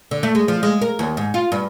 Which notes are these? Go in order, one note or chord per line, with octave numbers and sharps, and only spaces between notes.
D3
A3
G#3
F3
G#3
A#4
D#2
G#2
F4
G2